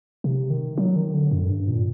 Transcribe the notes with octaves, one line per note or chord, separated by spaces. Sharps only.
C3
D#3
F#3
D#3
D3
F#2
G2
A#2